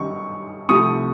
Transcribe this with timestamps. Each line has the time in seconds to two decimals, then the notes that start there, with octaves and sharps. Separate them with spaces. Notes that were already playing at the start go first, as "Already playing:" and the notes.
Already playing: F#2 D#3 G3 C#6
0.69 C2 C3 F3 A3 C#6 D#6